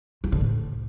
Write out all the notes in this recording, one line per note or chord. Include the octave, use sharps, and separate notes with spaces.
F3
D3
A2